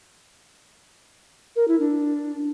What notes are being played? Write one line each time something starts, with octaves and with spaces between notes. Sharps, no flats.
A#4
E4
D4